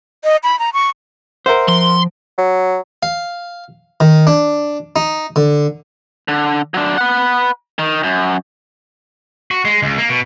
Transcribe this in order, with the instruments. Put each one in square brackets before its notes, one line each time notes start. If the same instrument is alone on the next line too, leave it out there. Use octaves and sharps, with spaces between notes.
[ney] D#5
B5
A#5
C#6
[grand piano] A#4 E5 F#5 [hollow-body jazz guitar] C5
[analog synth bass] F3 [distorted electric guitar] C6
[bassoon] F#3
[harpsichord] F5
D#3
D4
D#4
D3
[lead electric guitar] D3
F#3 D4
B4 F#5
D#3
F#2
[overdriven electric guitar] F#4
G#3
C#2
A#3
B2